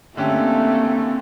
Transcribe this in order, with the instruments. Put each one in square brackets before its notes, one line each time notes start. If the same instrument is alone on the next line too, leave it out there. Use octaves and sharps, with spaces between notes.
[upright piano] D3 C#4 G4 [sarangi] A3 [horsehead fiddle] A#3 C4